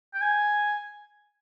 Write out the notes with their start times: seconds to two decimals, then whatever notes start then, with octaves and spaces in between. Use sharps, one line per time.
0.14 G5
0.22 G#5